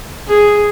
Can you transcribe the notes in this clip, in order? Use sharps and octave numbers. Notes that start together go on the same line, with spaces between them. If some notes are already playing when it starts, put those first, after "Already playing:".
G#4